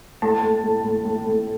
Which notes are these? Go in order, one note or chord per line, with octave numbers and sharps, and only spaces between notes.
A2 A5
A2
A2
A2
A2
A2